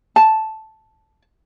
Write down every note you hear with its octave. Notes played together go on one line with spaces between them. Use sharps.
A5